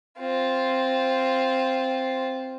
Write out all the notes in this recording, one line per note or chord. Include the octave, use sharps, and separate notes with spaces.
C4 F4